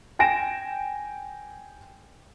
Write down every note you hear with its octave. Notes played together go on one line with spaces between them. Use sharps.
G5 G#5 A#6 D7 E7